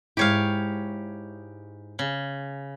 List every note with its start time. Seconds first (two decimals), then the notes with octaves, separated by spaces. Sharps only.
0.17 G#2 G#3 E4 G4 C#5 F5
1.99 C#3